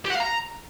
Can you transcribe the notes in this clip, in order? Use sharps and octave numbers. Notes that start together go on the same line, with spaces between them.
G4
F#5
F5
A#5